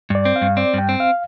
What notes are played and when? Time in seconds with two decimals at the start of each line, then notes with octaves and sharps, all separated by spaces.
0.10 G2 D5
0.25 C4
0.36 F5
0.42 G2
0.57 C4 D5
0.74 G2 G5
0.89 C4
1.00 F5